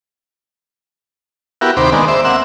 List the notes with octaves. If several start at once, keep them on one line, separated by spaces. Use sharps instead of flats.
B3 E4 F#4 G4 A#4
D#2 C3 C5 B5 D6
D#3 G#3 A#3 B3 D4
C5 E5 D6
A#3 C4 F#5 E6